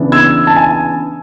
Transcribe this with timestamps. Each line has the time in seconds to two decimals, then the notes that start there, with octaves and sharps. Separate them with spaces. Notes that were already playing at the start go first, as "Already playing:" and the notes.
Already playing: C#3 E3 B3 D4
0.12 E6 G#6
0.47 A5
0.56 G#5